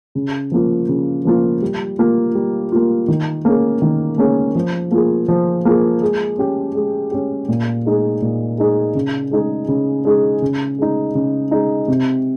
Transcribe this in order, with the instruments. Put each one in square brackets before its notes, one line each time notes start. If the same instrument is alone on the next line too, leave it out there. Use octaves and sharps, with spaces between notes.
[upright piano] C#3
F3 A#3 F4
C#3
F3 A#3 F4
G3
A#3 F4
G3
A#3 F4
D#3
A#3 C#4 G#4
D#3
A#3 C#4 G#4
F3
A#3 F4 G#4
F3
A#3 F4 G#4
G#3
C#4 G4
G#3
C#4 G4
A#2
G#3 D#4 G#4
A#2
G#3 D#4 G#4
C#3
G#3 D#4 G#4
C#3
G#3 D#4 G#4
C#3
G#3 D#4
C#3
G#3 D#4
C3